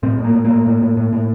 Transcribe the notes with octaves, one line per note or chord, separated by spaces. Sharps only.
A2 C4
A2
A#3
A2
A#3
A2
A2
A2
A2
A2